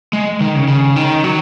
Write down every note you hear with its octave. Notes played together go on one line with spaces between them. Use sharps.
G#3
D#3
C#3
C#3
D#3
F#3